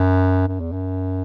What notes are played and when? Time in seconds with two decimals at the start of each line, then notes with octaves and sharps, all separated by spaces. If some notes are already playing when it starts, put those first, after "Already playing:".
Already playing: F#2
0.48 F#2
0.60 E2
0.72 F#2